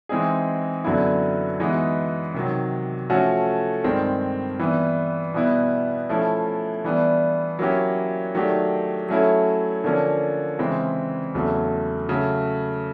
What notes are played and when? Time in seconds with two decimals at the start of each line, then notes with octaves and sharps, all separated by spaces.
0.09 E3 G#3 C4 D#4 G#4
0.84 F#2 D3 F#3 B3 E4
1.60 E3 G#3 B3 D#4 F#4
2.34 C3 D#3 F#3
3.10 F3 A3 C#4 F#4 A4
3.84 G2 D#3 G#3 C4
4.59 E3 G3 B3
5.34 B2 G3 B3 E4
6.09 F3 A3 C#4 E4
6.84 E3 G3 B3 D4
7.59 F#3 A#3 C#4 E4 G4
8.34 D#3 F#3 A3 D4 G4
9.09 F#3 A3 C#4 E4 A4
9.84 D3 F3 A#3 C#4
10.59 C#3 E3 G#3 C4
11.34 E2 C#3 F#3 A3
12.09 C#3 F#3 A3